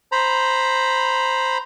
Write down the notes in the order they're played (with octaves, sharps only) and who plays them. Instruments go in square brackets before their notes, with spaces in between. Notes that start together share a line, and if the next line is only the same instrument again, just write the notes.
[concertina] C5 A#5 B5